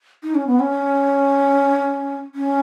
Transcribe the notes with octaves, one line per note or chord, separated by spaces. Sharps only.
D#4
C#4
B3
C#4
C#4